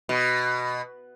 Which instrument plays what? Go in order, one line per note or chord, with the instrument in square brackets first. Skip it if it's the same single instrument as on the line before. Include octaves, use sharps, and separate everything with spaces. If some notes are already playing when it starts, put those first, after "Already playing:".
[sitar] B2